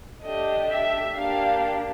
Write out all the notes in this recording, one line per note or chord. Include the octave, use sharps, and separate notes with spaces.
A3 D4 G4 D#5
E5
A#3 D4 G4 F5